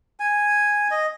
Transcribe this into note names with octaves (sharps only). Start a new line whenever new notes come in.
G#5
D#5